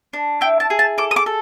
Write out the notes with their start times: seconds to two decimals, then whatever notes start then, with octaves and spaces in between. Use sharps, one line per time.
0.13 D4
0.41 E4 G5
0.60 A5
0.70 G#4
0.79 A5
0.98 A4 D6
1.11 D#6
1.16 D6
1.26 A4